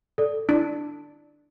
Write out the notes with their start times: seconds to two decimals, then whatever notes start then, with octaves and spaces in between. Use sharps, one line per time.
0.18 A4 D5
0.49 D4 E4